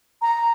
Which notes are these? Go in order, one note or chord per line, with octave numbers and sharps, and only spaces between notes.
A#5